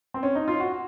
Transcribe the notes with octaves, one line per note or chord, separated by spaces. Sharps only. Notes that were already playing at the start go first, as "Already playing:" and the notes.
C4
C#4
D#4
F4
F#4